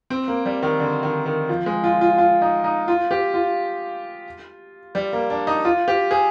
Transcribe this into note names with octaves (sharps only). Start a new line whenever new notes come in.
C4
A#3
G3
D#3
D3
D#3
D#3
F3
G#3
F4
F4
F4
D#4
D#4
F4
G4
F4
G3
A#3
D4
D#4
F4
G4
G#4